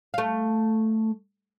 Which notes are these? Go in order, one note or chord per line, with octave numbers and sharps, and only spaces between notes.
A3 F5